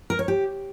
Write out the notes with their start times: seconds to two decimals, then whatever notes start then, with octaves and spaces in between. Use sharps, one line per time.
0.10 A#4
0.19 C#5
0.28 G4